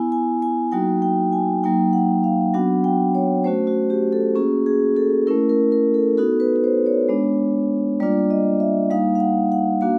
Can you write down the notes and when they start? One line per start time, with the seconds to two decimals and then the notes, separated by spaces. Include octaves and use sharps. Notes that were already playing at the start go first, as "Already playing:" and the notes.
Already playing: B3 E4 G#5
0.12 G#5
0.42 G#5
0.72 F#3 A#3 D#4 F#4 G5
1.02 G5
1.32 G#5
1.64 F#3 A#3 D#4 G5
1.93 F#5
2.24 F5
2.54 F#3 B3 D4 F#4 F#5
2.84 G5
3.15 C#5
3.44 A3 C#4 F#4 C5
3.67 F#4
3.90 G4
4.13 A4
4.35 A#3 C#4 F#4 G#4
4.66 G#4
4.96 A4
5.27 A3 C#4 E4 A#4
5.49 A#4
5.72 A#4
5.94 A4
6.17 B3 D#4 F#4 A4
6.40 B4
6.56 B4
6.64 C5
6.86 C#5
7.09 G#3 B3 D4
8.00 G3 A#3 D4 F4 D5
8.30 D#5
8.60 E5
8.90 G3 A#3 D#4 F5
9.15 F5
9.20 F#5
9.52 F#5
9.81 A#3 D4 F#4 F5